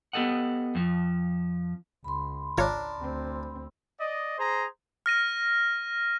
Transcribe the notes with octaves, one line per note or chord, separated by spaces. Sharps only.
B3 G4 A4 D#5 F#5
F2 F3
C#2 B5 C6
G#1 D4 F4 A#4 C#5
D2 C4
D5 D#5
G#4 C5 A#5
F6 A#6 D#7